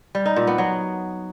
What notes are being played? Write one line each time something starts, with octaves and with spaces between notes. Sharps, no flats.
G3
D#4
A#2
B3
F#3